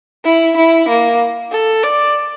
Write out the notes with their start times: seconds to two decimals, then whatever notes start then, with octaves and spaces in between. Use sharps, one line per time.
0.25 E4
0.56 E4
0.88 A#3
1.51 A4
1.83 D5